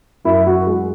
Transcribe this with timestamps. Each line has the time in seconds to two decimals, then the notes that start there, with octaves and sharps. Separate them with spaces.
0.25 F#2 E4
0.47 F#4
0.67 G#3